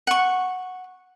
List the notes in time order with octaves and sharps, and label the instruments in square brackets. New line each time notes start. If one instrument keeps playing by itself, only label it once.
[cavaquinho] F#5 C#6